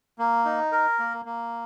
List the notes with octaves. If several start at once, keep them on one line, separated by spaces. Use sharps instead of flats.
A#3
D#4
A#4
A#3
A#3